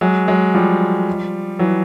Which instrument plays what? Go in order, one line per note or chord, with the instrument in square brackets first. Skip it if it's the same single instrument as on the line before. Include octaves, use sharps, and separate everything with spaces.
[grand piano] F#3 G#3
F#3 G#3
F3 G3
E3 F#3